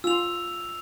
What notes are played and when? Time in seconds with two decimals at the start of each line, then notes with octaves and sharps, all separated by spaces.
0.04 F4 E6 F7